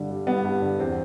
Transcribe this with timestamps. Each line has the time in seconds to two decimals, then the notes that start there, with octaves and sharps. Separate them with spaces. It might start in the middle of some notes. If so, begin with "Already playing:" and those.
Already playing: G2 D3
0.11 G3
0.27 G2 B3
0.45 G2
0.62 D3
0.79 E2 C4